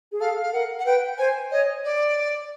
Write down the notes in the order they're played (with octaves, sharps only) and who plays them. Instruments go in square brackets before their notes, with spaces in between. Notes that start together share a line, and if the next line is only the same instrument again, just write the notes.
[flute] G#4
[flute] A4 [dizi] F5
[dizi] F5
[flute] A#4 [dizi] F#5
[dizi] F#5
[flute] B4 [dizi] G5
[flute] C5 [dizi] G#5
[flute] C#5 [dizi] D#5
[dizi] D5